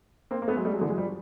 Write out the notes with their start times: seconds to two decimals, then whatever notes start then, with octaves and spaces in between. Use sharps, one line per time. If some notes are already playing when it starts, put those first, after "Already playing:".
0.31 A#3 C4
0.42 A#3
0.48 A3 B3
0.56 F#3 G#3
0.65 G3 A3
0.73 F#3 G#3
0.81 D3 E3
0.89 F#3 G#3
0.98 F3 G3